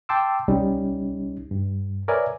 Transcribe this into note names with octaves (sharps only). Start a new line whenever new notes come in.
G5 A5 C6 D6 E6
C2 G3 C#4 D#4
G2
A#4 B4 C#5 D5 E5 G#5